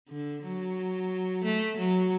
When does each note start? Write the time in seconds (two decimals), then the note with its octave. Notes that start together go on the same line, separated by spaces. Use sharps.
0.09 D3
0.43 F#3
1.44 A3
1.78 F#3